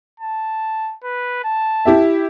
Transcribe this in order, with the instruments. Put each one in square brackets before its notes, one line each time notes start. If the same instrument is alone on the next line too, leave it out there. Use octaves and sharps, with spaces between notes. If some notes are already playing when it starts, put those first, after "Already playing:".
[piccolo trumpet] A5
B4
A5
[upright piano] E4 G4 E5